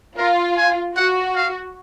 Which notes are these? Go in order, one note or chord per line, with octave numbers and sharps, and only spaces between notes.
F4 A#4
G#5
F#4 F#5
F5